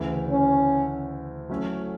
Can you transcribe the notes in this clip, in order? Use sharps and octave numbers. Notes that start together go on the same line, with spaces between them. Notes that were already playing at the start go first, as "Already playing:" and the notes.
Already playing: D2 C#3 E3
C#4
F#3 A3 C#4 E4 A4